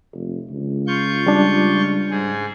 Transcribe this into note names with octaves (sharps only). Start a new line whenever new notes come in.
F1
C#2
F4 C#6 G6
G3 D4
G#2 G#4